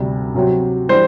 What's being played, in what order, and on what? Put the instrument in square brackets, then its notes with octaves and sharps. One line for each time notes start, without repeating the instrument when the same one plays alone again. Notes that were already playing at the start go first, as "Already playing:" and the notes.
Already playing: [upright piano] D2 C3 G3
C3 F#3 C4 F#4
[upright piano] E3 G3 D4 [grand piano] C5